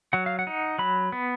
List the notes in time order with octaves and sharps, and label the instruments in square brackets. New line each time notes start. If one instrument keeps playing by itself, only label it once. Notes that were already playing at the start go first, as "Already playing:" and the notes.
[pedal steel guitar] F#3 F#5
F5
F#5
D#4
F#3 B5
B3